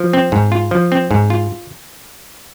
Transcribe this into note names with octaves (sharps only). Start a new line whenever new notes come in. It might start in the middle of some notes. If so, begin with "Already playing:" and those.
Already playing: F3
C4
G#2
F4
F3
C4
G#2
F4